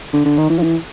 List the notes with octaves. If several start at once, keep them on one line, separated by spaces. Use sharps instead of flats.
D3
D3
D#3
E3
F3
E3